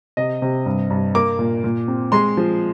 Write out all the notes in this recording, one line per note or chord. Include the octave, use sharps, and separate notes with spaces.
C3 D#5
C3
G2
G2
A#3 D6
A#2
A#2
C4
G#3 C6
F3